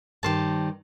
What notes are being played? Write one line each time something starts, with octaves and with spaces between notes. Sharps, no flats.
G2 D#3 G4 C5 A5